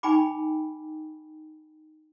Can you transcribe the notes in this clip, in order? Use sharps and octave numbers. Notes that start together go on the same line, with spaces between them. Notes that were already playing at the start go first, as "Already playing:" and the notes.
D#4 G5 G#5 B5 D6